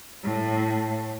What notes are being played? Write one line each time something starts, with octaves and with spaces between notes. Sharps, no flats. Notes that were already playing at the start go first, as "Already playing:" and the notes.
A2